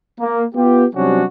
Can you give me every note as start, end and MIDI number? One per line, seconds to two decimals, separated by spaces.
0.19 0.44 58
0.55 0.85 59
0.55 0.85 65
0.55 0.85 67
0.95 1.24 48
0.95 1.24 54
0.95 1.24 55
0.95 1.24 61
0.95 1.24 62
0.95 1.24 66